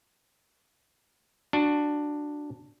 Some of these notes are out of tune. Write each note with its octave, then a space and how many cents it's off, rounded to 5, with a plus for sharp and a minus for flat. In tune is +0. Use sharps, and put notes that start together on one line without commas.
D4 +5 F#4 -10